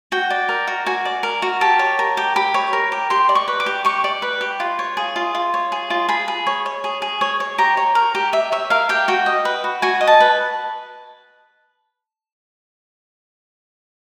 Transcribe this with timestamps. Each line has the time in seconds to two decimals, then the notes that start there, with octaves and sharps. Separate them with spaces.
0.12 F#4 G5
0.30 D5
0.49 A#4
0.67 F#4
0.86 F#4 G#5
1.05 D5
1.23 A#4
1.42 F#4
1.61 G4 A5
1.79 C#5
1.99 A#4
2.17 G4
2.36 G4 B5
2.54 C#5
2.73 A#4
2.92 G4
3.10 G4 C6
3.29 D5
3.35 C#6
3.48 B4
3.60 D6
3.66 G4
3.85 G4 C#6
4.04 D5
4.22 B4
4.41 G4
4.60 F4
4.79 C#5
4.97 G#4
5.16 F4
5.35 F4
5.54 C#5
5.72 G#4
5.90 F4
6.09 G#4 B5
6.28 G#4
6.47 C#5
6.66 C#5
6.84 G#4
7.02 G#4
7.21 C#5
7.40 C#5
7.58 G4 A#5
7.77 C#5
7.95 A#4
8.15 G4
8.33 G4 E5
8.52 C#5 E5
8.70 A#4 F5
8.89 G4 G5
9.08 F#4 G5
9.26 D#5
9.45 B4
9.64 F#4
9.82 F#4 G#5
10.01 D#5
10.07 A5
10.20 B4